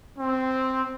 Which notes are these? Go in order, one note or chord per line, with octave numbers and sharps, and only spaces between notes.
C4